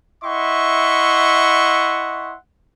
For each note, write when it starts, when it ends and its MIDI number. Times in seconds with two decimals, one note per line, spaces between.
0.24 2.35 64
0.24 2.35 75
0.24 2.35 76
0.24 2.35 78
0.24 2.35 84
0.24 2.35 85